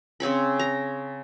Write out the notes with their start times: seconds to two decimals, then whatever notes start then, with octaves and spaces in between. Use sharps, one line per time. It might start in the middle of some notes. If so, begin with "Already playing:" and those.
0.20 C#3 C4 C#5 B5
0.59 A#5